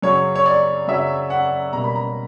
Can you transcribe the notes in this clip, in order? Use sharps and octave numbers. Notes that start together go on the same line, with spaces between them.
F#2 C#3 F#3 C#5
C#5
D5
F#2 C#3 F#3 E5
F#5
B2 G3 A#3 A#5
B5
A#5